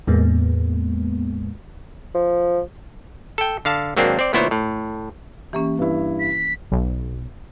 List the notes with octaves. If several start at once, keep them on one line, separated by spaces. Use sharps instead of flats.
E2 A2 G#3 A#3 B3
F3
A4 G5
D3 F5 A5
G#1 F#3 A#3 C4 D4
C4 D5
D2 A#2 B3 E4 C5 C#5
A2
E3 A#3 C#4 G4
G2 E4
B6
B1